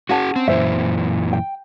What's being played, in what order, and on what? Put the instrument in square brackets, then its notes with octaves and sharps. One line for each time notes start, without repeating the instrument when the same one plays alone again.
[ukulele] C#4 F#5 A5 [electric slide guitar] F#4 G#4
[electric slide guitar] C4
[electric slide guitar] F#2 A#2 E3 [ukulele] C5 E5
[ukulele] G5